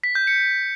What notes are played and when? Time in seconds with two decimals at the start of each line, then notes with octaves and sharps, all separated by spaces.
0.04 B6
0.15 G6
0.27 C#7